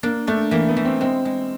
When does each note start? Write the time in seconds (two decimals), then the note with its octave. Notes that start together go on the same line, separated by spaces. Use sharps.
0.03 A#3 D4
0.27 A3 D4
0.51 E3 A#3
0.69 B3
0.77 E3
0.85 C4
1.01 G#3 C4
1.25 G#3